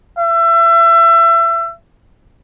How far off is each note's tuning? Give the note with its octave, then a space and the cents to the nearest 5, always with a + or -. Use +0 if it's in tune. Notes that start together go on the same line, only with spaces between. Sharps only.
E5 +30